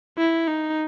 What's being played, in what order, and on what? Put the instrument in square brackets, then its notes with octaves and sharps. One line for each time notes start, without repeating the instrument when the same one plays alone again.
[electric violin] E4
D#4